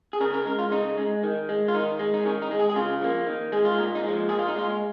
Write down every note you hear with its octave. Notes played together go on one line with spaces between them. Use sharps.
G#4
C#3 A#4
A#4
G#3 A#4
F4
C#3 D#4
G#3
D#3
G#3
F4
D#3 D#4
G#3
D#4
D#3 C#4
D#4
G#3
G#4
G#4
C#3 F4
F3 A#3
D#3
G#3 G#4
F4
A#2 D#4
D#4
G#3
F3
A#2 G#4
F4
D#4
G#3 F4